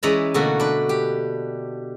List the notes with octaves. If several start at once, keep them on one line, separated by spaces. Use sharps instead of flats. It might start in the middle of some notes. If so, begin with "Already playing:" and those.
E3 G#3 C#4 D5 A#5 B5
B2 D3 E3 A3 A#3 F#4
D4 B4
G4